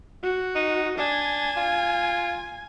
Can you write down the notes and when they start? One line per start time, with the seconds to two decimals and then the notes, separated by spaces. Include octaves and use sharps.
0.23 F#4
0.55 D#4
0.98 D4 G#5
1.57 F4